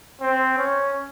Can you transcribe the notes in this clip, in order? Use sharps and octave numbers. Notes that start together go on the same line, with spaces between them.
C4
C#4